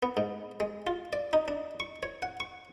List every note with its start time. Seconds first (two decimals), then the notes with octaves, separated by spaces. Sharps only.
0.03 B3
0.17 G#2
0.60 G#3
0.87 F4
1.13 D5
1.33 D#4
1.48 D4
1.80 C#6
2.03 C#5
2.22 F#5
2.40 C#6